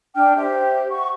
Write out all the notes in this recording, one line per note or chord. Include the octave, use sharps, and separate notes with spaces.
D4 G5 F6
G4 C5 E5
F#5 C#6